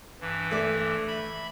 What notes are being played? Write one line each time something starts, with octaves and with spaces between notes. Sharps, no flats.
G2 E3
A3 D5
E5 B5